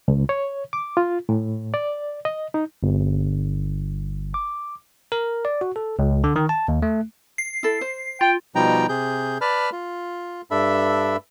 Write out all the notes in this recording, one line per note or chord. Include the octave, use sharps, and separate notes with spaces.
C#2
C#5
D6
F4
A2
D5
D#5
D#4
G1
D6
A#4
D5
F#4
A4
C#2
D3
D#3
A5
D#2
A3
C7
E4 A4
C5
F4 G5
B2 F3 G3 D#4 G5 A#5
C3 G#4 G6
B4 D5 A5 B5 F6
F4
G2 D4 A4 E5 B5